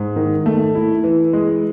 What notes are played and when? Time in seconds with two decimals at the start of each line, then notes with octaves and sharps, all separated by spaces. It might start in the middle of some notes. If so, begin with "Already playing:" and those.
Already playing: G#2
0.16 D#3
0.46 A3
0.75 E4
1.04 E3
1.33 G#3